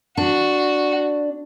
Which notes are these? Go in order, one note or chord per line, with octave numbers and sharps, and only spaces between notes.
D4 F#4